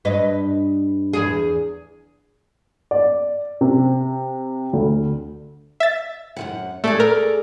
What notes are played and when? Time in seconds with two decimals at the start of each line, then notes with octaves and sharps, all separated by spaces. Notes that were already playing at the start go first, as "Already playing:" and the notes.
0.05 G2 B4 D#5
1.13 E2 G#4
2.91 D5
3.61 C3
4.73 D2
5.80 E5 A6
6.36 F#2 F3 F#5
6.84 A3 G#4 A4 D5
7.00 A#4